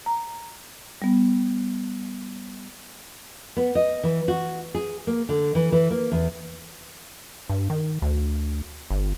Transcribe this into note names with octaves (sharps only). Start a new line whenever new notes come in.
A#5
G3 B3
B3
D#5
E3
F#4
G#4
A#3
D3
E3
E3
A#3
E2
G2
D#3
D2
G1